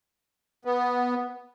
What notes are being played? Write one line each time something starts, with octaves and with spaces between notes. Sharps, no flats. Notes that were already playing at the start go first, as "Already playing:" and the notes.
B3